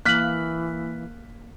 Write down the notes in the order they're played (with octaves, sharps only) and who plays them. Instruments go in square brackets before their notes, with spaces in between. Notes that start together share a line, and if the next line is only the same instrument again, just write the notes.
[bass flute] E3 [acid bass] A#3 [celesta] F6 F#7 [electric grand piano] F#6 B6